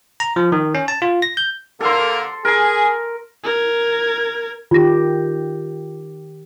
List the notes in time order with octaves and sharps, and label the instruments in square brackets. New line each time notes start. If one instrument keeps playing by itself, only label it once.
[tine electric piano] A#5
F3
D#3
C#4
A5
F4
A#6
G6
[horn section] D3 A#3 A#4 [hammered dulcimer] A4 C6
[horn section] G#4 [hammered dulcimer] A#4
[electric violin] A#4 G#6
[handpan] D#3 G4 [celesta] F4 A#6